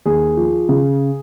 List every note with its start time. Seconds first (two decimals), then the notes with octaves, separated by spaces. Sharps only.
0.06 D#2 G#4
0.37 F3
0.69 C#3